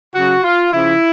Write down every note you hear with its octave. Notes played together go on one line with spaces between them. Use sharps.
C#3 F#3 F#4
F4
C#3 F3 E4